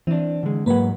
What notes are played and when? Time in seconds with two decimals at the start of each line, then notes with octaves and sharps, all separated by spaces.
0.07 E3 C4 D4
0.43 D3 G#3
0.66 G#2 F#3 A#3 B4 F#5